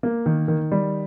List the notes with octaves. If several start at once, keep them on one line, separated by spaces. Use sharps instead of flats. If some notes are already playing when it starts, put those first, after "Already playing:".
A#3
D#3
D#3
G3